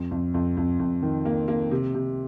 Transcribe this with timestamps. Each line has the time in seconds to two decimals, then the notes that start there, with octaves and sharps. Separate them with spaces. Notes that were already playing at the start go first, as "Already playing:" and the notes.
Already playing: F2
0.11 F2
0.34 F2
0.57 F2
0.80 F2
1.02 D#3
1.25 A#3
1.48 A#3
1.71 C3
1.95 C3